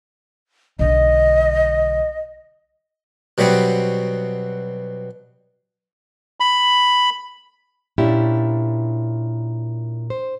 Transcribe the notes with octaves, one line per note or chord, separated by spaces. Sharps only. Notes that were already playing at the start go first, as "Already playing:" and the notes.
B1 D3 D#5
B2 F#3 G3 B3 C4
B5
A#2 C#4 D4 E4 G4
C5